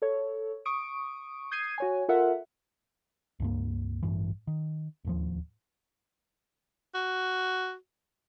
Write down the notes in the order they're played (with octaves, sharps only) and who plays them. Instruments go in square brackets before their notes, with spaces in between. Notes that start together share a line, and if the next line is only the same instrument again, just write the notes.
[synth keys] A4 C#5
C#6 D#6 D7
D#6 G6 G#6 C7 D#7
F#4 C#5 G#5
F4 A4 A#4 E5 F#5
[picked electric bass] C#2 G2 A#3
A1 G2 E3
D#3
D1 D#2 F3
[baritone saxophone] F#4